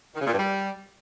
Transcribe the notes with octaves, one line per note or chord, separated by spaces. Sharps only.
D#3
C#3
A#2
G2
G3